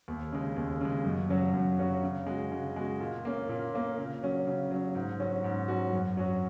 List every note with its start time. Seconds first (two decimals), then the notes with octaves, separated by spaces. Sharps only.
0.08 D#2
0.32 C#3 G#3
0.56 D#2
0.81 C#3 G#3
1.04 F#2
1.29 C#3 F#3 C#4 F#4
1.54 F#2
1.79 C#3 F#3 C#4 F#4
2.03 C#3
2.26 G#3 F#4
2.52 C#3
2.76 G#3 F#4
3.00 A#2
3.25 A#3 C#4
3.49 A#2
3.74 A#3 C#4
3.97 C#3
4.23 F#3 C#4
4.47 C#3
4.71 F#3 C#4
4.95 G#2
5.20 F#3 C#4 F#4
5.44 G#2
5.68 F#3 C#4 F#4
5.93 F#2
6.17 F#3 C#4 F#4